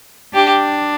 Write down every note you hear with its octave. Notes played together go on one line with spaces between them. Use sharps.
D4 G4